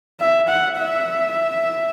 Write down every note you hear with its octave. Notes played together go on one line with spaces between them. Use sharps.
E5
F#5
E5